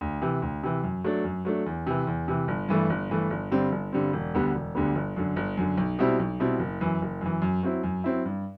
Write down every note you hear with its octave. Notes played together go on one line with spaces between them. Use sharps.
D2
C3 E3
D2
C3 E3
F#2
F#3 A3 D4
F#2
F#3 A3 D4
E2
C3 E3
E2
C3 E3
G1
G2 E3 A3
G1
G2 E3 A3
G1
G2 D3 G3 C4
G1
G2 D3 G3 C4
E1
D2 D3 G3 B3
E1
D2 D3 G3 B3
G1
F#2 D3
G1
F#2 D3
B1
B2 G3 C4 E4
B1
B2 G3 C4 E4
F#1
F#2 E3
F#1
F#2 E3
F#2
F#3 C4 E4
F#2
F#3 C4 E4
G2